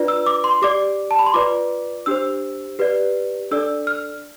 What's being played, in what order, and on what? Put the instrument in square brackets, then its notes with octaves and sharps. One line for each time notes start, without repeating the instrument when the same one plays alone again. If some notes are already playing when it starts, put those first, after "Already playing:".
Already playing: [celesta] D4 F4 B4 D5
E6
D6
C6
G4 D5 D6
A5
B5
C6
F4 B4 D5 D6
D4 G4 C5 E6
G4 B4 D5
D4 A4 D5 E6
F6